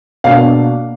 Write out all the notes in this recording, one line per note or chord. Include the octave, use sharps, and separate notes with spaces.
B2 A#3 D4 F5